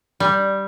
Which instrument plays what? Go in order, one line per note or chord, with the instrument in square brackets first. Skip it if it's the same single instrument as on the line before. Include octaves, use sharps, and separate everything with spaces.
[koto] G3